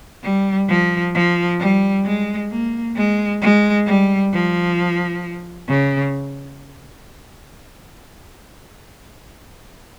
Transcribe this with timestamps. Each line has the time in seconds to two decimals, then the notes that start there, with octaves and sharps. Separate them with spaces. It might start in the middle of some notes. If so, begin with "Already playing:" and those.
0.23 G3
0.68 F3
1.14 F3
1.60 G3
2.05 G#3
2.50 A#3
2.96 G#3
3.41 G#3
3.87 G3
4.32 F3
5.68 C#3